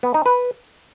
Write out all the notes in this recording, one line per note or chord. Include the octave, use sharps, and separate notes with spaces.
B3
D#4
B4